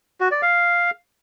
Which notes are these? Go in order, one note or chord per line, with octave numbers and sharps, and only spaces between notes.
F#4
D5
F5